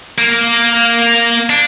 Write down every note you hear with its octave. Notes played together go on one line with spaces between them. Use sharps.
A#3
D4